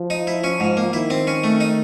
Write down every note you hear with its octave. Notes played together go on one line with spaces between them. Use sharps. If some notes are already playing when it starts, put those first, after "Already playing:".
Already playing: F3
D#4
E4
C#4
G#2
A#3
D#3 E4
C4
C#4
A3
D#4